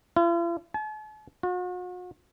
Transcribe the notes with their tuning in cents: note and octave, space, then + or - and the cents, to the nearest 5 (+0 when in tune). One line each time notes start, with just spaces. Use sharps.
F4 -45
A5 -45
F#4 -45